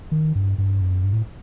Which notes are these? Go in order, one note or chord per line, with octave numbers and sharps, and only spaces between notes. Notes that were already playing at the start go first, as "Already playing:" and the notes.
D#3
G2
G2
F#2
G2
A2